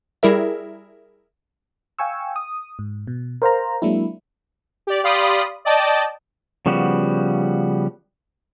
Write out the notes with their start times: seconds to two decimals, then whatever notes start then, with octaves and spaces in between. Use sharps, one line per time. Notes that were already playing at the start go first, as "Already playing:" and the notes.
0.23 G3 E4 G#4 A#4 E5
1.99 F5 G5 G#5 C#6 E6
2.36 D#6
2.79 G#2
3.07 B2
3.42 A#4 C5 F5 A#5
3.82 F#3 G#3 A#3 D4 E4
4.87 G4 D5
5.03 G4 D5 F5 B5 C6 D#6
5.65 D5 D#5 G5 A5 D6
6.66 C#3 F3 G3 B3 F#4